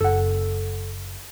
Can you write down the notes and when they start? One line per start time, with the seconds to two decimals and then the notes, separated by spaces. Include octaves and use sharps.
0.01 F#1 A4 F#5